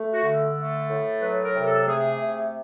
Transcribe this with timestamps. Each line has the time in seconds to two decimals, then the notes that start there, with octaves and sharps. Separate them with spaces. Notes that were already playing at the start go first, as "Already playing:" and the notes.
Already playing: A3
0.13 F#4
0.24 D3
0.57 A3
0.90 A2
1.22 F#3 B4
1.43 A#4
1.55 C3
1.66 A4
1.88 A3 G#4
2.21 C3